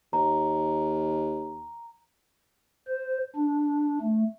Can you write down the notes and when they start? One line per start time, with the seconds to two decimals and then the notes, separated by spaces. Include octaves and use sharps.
0.13 D#2 A#5
2.88 C5
3.36 D4
4.01 A3